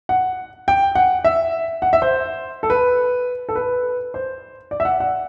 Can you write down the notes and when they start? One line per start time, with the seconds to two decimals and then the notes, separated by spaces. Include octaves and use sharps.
0.09 F#5
0.68 G5
0.95 F#5
1.24 E5
1.82 F#5
1.93 E5
2.02 C5
2.63 A4
2.70 B4
3.49 A4
3.56 B4
4.14 C5
4.71 D5
4.80 E5
4.85 F#5
5.00 F#5